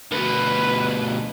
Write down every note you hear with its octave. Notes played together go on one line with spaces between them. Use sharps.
D2 B2 B4